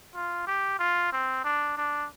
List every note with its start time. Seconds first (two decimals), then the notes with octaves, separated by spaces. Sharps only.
0.15 F4
0.47 G4
0.79 F4
1.12 C4
1.44 D4
1.78 D4